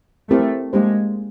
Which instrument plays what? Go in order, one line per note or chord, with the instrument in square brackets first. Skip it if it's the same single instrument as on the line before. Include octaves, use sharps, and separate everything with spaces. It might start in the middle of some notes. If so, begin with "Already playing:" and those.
[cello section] A3 [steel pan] C4 E4 G4 A#4
[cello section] G#3 [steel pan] A#3 D4 G4 C5